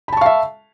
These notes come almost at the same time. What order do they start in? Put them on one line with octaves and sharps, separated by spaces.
B5 A5 C#6 F5 E5